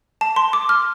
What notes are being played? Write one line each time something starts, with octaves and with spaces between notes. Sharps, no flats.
A5
C6
D6
F6